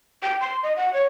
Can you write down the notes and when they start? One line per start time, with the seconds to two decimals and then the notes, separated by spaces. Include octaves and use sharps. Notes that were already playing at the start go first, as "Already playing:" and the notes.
0.23 G5
0.41 C6
0.63 D#5
0.77 F#5
0.94 C#5